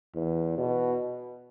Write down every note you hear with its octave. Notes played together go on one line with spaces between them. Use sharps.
E2
B2